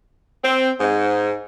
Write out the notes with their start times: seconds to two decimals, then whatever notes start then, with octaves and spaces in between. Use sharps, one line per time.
0.43 C4
0.80 G#2